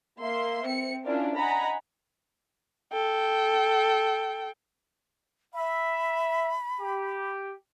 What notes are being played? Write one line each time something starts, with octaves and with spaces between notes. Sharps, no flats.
A#3 E5 C6
C4 C#7
C#4 D4 E4 F4 A#4 D5
D#5 F#5 G#5 A#5 B5
A4 G5
E5 B5
G4